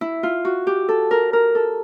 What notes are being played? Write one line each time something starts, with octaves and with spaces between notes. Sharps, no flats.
E4
F4
F#4
G4
A4
A#4
A#4
A4